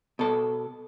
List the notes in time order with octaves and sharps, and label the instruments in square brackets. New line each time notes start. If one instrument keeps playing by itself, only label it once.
[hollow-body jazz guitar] B2 A4